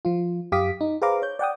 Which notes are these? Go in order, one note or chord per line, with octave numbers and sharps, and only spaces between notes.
F3 F4
F#2 G4 F5 D6 D#6 B6
D#4
G#4 B4 C5 F5 A#5 D6
C#5 G6
D5 F#5 G5 D#6